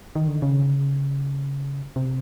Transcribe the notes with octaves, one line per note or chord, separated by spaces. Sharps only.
D#3
D3
C#3
C3